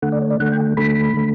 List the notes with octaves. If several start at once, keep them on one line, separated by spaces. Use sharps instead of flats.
D3 A3 F#5
D5
C#5
D5
D3 A3 F#5
G5
D3 A3 B5
D3 A3